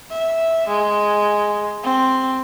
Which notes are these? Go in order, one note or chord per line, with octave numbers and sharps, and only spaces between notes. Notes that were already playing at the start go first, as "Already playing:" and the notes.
E5
G#3
C4